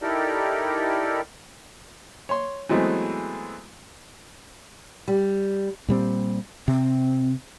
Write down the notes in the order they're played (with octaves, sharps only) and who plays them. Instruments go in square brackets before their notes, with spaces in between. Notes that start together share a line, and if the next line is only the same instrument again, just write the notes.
[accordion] D#4 E4 G4 A4 A#4 D5
[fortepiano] C#5 C6
E3 F#3 G#3 A3 B3 C4
[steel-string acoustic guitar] G3
[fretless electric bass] A#2 G3 C4
[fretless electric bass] C3 [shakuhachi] C4